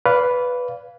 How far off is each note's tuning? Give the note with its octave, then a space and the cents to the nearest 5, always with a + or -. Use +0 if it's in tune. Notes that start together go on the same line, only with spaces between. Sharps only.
B4 +0 D5 -35 F5 +0